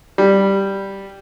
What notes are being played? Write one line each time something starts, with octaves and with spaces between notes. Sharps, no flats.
G3